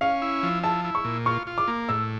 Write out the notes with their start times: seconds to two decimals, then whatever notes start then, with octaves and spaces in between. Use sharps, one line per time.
0.01 C#4 F5
0.22 E4
0.43 F3
0.63 E4 A5
0.85 E4
0.95 C#6
1.05 A#2
1.26 F4 C#6
1.47 F4
1.58 D6
1.68 A#3
1.89 A2 E6